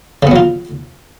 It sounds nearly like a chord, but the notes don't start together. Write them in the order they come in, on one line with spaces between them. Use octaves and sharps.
C#3 B3 F#3 F4